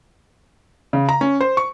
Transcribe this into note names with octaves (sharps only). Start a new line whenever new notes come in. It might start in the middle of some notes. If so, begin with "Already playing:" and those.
C#3
A#5
C#4
C5
C#6